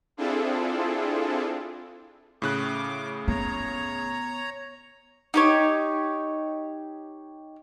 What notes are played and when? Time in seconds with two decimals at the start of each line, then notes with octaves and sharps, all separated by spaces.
0.17 C4 D4 E4 F4 G#4 A4
2.42 A2 C#3 D6 F#6
3.28 B3 C#5 A#5
5.34 D#4 G4 C#5